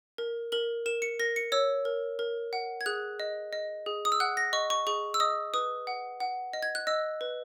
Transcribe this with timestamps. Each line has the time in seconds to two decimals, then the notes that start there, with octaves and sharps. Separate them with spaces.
0.18 A#4
0.52 A#4 F#7
0.86 A#4 E7
1.02 C#7
1.20 A#4 A#6
1.36 C#7
1.52 C#5 E6
1.85 A#4
2.19 A#4
2.53 F#5
2.81 G#6
2.86 G#4 F#6
3.20 D#5
3.53 D#5
3.86 G#4
4.05 D#6
4.12 E6
4.20 F#5 F#6
4.37 A#6
4.53 D#5 C#6
4.70 C#6
4.87 G#4 C#6
5.14 E6
5.20 D#5 D#6
5.54 B4 D#6
5.87 F#5
6.20 F#5
6.53 D#5
6.62 G#6
6.75 F#6
6.87 D#5 E6
7.21 B4